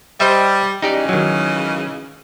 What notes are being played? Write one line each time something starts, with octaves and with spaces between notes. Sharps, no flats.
G3 C5 D#5 E5
C#3 E3 G#3 D#4 G4 D5
D#3 F#3